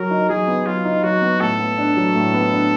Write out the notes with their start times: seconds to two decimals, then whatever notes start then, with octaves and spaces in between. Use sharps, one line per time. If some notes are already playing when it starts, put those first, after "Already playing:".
Already playing: F#3 A#4
0.11 D#4
0.29 F#3 G#4
0.48 B3
0.66 F#3 F4
0.85 D#4
1.03 F#3 F#4
1.22 B3
1.41 A2 A4
1.59 B3
1.78 D4
1.97 F#3
2.15 A2
2.34 B3
2.52 D4